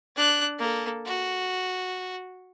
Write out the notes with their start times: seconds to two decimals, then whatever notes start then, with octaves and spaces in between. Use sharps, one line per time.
0.16 D4 F#6
0.59 A#3 A4
1.06 F#4